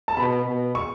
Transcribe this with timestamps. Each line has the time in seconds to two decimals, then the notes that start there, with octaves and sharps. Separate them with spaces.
0.08 A5
0.17 B2 B5
0.46 B2
0.75 C#6